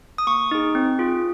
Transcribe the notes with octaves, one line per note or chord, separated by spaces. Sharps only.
D#6
A#3 C#6
D#4 G#4
C4
F4 G#4